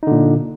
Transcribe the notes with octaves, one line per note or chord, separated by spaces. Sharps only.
A#2 D3 D#4